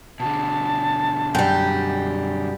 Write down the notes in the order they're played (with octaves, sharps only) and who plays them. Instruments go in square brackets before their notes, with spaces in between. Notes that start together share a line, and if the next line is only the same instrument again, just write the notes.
[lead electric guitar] B2 D3 [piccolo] A5
[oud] F#2 G3 [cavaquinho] G5